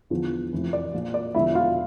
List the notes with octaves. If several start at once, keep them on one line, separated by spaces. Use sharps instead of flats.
E2 D3 F3
F1 F2 E3
D5
A#1 A#2 F3
D5
E1 E2 D3 F3 E4 E5
F4 F5